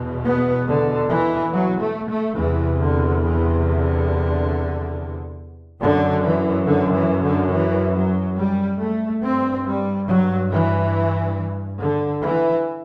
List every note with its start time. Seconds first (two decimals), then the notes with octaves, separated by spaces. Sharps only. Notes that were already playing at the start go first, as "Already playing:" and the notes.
Already playing: E2 B2
0.23 B3
0.66 D3
1.09 E3
1.52 F#3
1.81 A3
2.10 A3
2.38 E2 C3 E3
2.81 D3
3.24 E3
3.66 D3
5.80 F#2 D3
6.23 E3
6.66 D3
6.94 E3
7.23 D3
7.52 E3
7.95 F#3
8.38 G3
8.81 A3
9.23 G2 C4
9.66 G3
10.08 F#3
10.52 E3
11.81 D3
12.23 E3